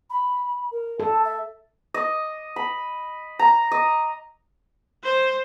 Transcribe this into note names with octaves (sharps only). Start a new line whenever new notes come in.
B5
A#4
A4 A5
E5
D#5
B5
A#5
D#5
C5